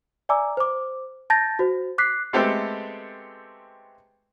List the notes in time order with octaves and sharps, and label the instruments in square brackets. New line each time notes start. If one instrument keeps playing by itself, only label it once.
[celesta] D5 E5 G#5 A#5 D6 E6
C5 D6
A5 G6 A6 A#6
F#4 C5
D6 F#6 B6 C7
[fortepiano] G#3 A3 B3 C4 G4 A4